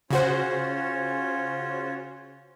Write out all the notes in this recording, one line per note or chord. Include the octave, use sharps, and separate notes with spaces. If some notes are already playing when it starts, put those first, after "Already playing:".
C#3 C#4 F4 F#4 C5 C#5